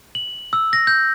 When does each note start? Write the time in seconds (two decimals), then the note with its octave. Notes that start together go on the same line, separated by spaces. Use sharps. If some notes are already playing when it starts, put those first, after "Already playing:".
0.15 F#7
0.53 E6
0.73 A#6
0.87 G6